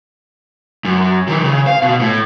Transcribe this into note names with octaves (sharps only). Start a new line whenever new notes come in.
F#2
D#3 E3
C#3
F5
B2
A2